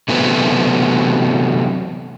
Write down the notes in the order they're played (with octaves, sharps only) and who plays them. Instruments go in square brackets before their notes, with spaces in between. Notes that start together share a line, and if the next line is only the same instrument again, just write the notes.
[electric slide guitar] C3 E3 F#3 A3 B3 C4